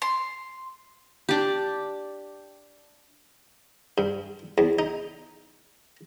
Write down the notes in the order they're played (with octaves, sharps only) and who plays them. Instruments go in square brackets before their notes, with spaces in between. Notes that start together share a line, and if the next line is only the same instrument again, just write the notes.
[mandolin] C6
[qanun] D4 G4
[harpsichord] G2
E2
D#4